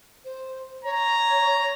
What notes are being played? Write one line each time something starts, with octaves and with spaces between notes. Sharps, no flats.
C5
C#5 A#5